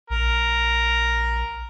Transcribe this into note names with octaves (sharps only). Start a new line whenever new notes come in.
A#1 A#4